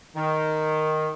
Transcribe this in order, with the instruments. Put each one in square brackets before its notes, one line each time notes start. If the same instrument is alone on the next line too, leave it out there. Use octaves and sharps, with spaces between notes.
[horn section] D#3